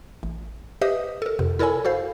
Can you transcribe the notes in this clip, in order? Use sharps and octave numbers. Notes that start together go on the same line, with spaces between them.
A1
G4 B4 C5 D#5 E5 D#6
A4 A#4
F2 C3
E4 A4 A#4 C#5 G#5 B5
F#4 A4 C5 F5